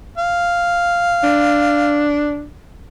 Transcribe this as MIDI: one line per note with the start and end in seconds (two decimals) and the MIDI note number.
0.18 2.04 77
1.23 2.45 62